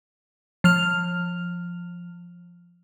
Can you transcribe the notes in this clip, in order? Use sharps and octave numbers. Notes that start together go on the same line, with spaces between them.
F3 F6 F7